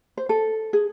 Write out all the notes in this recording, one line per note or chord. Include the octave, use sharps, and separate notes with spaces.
C5
A4
G#4